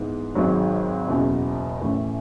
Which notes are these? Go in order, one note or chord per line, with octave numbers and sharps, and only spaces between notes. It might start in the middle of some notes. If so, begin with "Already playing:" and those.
Already playing: G#2 E3 B3
G#1 G#2 F#3
F#1 E2 B2
A1 A2 E3 A3